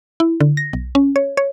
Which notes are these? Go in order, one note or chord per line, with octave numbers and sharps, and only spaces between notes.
E4
D3
A#6
B1
C#4
C#5
C#5